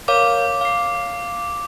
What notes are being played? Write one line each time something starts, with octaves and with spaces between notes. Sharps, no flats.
A#4 C#5 F5 D6
F5 C7